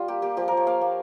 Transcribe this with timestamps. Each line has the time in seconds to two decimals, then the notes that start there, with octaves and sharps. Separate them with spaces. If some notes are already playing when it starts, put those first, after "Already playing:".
Already playing: G3 F4
0.08 A#3 G4
0.22 A#3 G4
0.37 F3 G4
0.48 F3 A#4
0.57 C#5
0.67 A#3 F5
0.81 A#3